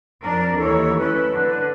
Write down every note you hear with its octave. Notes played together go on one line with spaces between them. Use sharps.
F2 D4 A#4
D#2 E3 A4 C#5
A3 C#4 E4 B4
D3